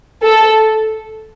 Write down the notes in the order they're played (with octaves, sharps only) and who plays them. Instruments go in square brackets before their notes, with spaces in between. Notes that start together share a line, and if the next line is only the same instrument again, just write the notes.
[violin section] A4